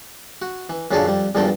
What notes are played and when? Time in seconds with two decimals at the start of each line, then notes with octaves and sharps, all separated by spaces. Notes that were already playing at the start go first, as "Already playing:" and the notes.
0.42 F#4
0.69 E3
0.91 F#2 A#2 C#3 D4 G#4 A4
1.06 F2 G3
1.35 E2 G2 A#2 F3 A4 G5